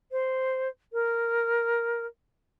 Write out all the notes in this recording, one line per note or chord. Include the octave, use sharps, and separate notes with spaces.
C5
A#4